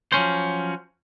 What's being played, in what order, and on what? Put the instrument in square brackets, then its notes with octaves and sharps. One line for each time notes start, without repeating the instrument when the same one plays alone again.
[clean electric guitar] F3 F#3 C#4 C5